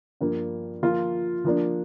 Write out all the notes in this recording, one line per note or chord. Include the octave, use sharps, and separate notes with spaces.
G2 F3 A#3
F3 A#3 F4 A#4
F3 A#3 D4